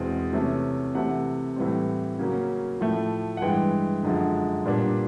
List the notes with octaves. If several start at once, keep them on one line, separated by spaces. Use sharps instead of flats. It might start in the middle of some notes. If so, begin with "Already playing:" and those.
Already playing: E2 B2 G#3 C4
C3 E3 A3 C#4
C3 E3 A3 F#5
A2 E3 G3 C4
C#3 F#3 A#3 C#4
A2 F3 A3
F#5
G2 E3 G#3 G5
F#2 D3 F3 G#3
A#2 G3 B3 D4